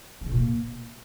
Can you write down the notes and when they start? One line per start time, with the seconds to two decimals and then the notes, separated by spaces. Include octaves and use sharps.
0.21 D#3
0.26 C3
0.32 A#2
0.37 A#3